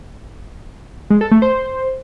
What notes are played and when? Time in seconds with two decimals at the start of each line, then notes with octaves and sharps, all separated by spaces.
1.10 G#3
1.21 A4
1.31 A3
1.42 C5